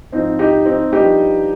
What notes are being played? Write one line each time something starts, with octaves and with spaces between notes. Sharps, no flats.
G#2 F3 C4 D#4
D#4 G4
C4 D#4
G2 F3 D#4 G4